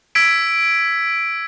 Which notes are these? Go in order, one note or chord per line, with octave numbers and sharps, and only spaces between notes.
E6 G#6 B6 D7